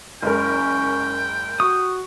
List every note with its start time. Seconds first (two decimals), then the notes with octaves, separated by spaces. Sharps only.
0.22 F#1 G#3 C#4 A#4 G5
1.60 F#4 C#6 D#6